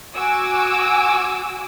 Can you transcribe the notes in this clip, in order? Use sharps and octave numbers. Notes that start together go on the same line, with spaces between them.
F#4 G#5 D6 E6